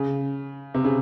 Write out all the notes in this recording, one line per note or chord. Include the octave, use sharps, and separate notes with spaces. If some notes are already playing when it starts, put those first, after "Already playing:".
Already playing: C#3
C3
C#3